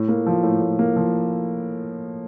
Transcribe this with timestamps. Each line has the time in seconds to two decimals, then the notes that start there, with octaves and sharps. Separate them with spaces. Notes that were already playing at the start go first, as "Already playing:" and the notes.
Already playing: A2
0.08 A#3
0.26 F3
0.43 A2
0.61 A2
0.79 A#3
0.96 F3